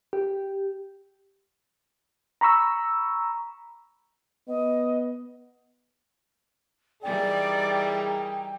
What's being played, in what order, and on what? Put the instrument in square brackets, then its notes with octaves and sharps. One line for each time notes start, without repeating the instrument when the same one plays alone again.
[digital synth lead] G4
[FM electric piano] A#5 B5 C#6 E6
[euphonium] B3 [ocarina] D#5
[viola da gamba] E3 G3 D#4 [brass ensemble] G#4 A#4 [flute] D5 [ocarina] G5